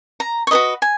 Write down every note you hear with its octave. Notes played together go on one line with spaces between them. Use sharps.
A#5
C#6
F#4 B4 D#5 B5
G#5